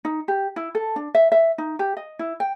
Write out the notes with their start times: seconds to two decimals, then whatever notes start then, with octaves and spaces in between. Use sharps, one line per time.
0.05 D#4
0.28 G4
0.56 E4
0.75 A4
0.96 D4
1.15 E5
1.32 E5
1.58 D#4
1.79 G4
1.97 D#5
2.19 E4
2.40 G5